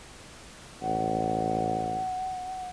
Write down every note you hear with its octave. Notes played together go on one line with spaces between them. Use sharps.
A1 F#5